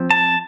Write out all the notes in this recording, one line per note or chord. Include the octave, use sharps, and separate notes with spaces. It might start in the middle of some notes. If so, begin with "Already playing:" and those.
Already playing: F3 C4
A5